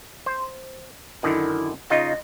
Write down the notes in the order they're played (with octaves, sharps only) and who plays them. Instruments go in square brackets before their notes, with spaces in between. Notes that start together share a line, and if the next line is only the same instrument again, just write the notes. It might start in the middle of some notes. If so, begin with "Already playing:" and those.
[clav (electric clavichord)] C5
[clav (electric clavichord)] F#2 D3 D#3 [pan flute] E4
[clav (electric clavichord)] C#3 D#4 F4 [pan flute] D#5